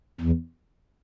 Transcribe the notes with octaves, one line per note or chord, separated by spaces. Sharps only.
E2